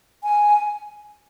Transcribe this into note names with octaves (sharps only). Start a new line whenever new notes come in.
G#5